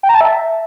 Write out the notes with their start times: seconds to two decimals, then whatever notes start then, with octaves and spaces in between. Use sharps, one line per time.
0.03 G5
0.09 A#5
0.15 A5
0.21 E5